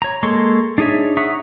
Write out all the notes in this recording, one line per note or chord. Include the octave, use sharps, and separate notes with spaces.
C#5 A#5
G#3 A#3 A4 C6 C#6
D4 D#4 G#4 C#5 E5
E5 F#5 A#5 C#6 D#6